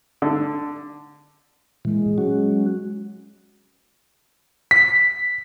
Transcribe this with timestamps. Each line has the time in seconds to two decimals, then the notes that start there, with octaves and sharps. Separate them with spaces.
0.22 D3
1.85 A#2 E3 G#3
2.18 F#3 C#4 F#4
4.71 B6